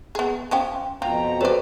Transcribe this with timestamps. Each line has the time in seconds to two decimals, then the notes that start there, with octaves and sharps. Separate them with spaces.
0.15 B3 G#4
0.51 F3 C#4 G5
1.02 F2 B2 F4 G5 A#5
1.41 F#4 A4 B4 C5 D5